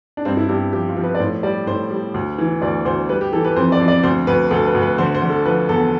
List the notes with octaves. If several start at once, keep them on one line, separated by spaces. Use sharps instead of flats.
D4
G2 C4
E4
G2 G4
F3 G4
F4
F3
B4
D5
A2 C5
G3 D5
A2 C5
G3
D2
E3
D2 D5
D2 C5
G3 B4
G4
E3 A4
B4
F2 C5
D5
F2
D5
D2 C5
D2 B4
D2 A4
B4
D2
B4
D3 C5
C5
D3
A4
F3 B4
E2 A4